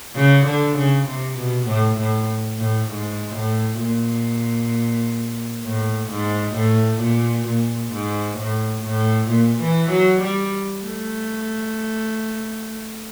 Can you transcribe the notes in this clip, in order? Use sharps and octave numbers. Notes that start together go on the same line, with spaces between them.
C#3
D3
C#3
C3
B2
A2
A2
A2
G#2
A2
A#2
A2
G#2
A2
A#2
A#2
G#2
A2
A2
A#2
E3
F#3
G3
A3